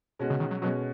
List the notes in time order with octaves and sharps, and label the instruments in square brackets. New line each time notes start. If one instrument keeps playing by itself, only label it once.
[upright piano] B2 G#3 C#4 F#4
[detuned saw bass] C#3
D#3
F#3
[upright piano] B2 G#3 C#4 F#4 [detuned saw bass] F#3